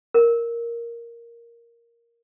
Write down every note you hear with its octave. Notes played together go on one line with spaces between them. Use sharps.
A#4